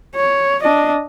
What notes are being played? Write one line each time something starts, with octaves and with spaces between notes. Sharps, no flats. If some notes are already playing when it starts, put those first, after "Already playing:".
C#5
D4 D#5